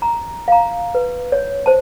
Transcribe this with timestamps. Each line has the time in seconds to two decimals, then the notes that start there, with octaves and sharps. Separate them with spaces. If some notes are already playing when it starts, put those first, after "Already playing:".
0.02 A#5
0.48 F5 A#5
0.95 B4
1.32 C#5
1.66 C5 A5